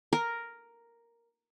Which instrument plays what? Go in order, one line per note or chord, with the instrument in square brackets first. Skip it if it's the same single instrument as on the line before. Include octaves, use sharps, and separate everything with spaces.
[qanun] A#4